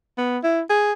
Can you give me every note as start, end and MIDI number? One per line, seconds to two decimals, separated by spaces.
0.18 0.38 59
0.43 0.61 64
0.70 0.93 68